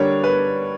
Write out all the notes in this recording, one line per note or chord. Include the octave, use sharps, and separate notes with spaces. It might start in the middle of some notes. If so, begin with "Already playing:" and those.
Already playing: D3 G3 A#3 D4 C#5
B4